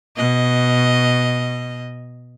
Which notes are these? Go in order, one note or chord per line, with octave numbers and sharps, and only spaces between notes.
B2 D#5